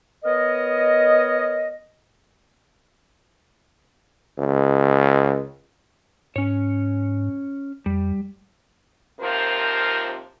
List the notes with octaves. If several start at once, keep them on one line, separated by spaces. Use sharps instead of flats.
B3 A#4 C#5 D#5
C#2
G#2 C#4 C#5
F2 G3
D#2 C3 F3 F4 A#4 C5